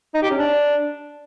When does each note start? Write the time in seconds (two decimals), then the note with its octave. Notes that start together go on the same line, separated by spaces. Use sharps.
0.15 D#4
0.23 G4
0.31 C#4
0.39 D4